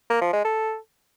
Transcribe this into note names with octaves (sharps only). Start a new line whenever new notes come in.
A#3
F3
G#3
A4